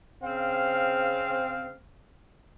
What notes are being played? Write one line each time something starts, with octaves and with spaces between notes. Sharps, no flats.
C#3 C4 F5